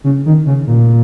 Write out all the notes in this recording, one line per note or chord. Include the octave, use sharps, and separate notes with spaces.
C#3
D#3
C#3
A#2